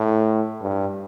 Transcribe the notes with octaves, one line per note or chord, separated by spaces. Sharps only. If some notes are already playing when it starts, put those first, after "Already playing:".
Already playing: A2
G2